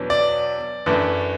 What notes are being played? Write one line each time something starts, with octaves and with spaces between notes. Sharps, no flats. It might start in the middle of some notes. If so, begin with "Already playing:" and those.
Already playing: E2 B2 F#3 D4
D5
F#2 E3 A3 D4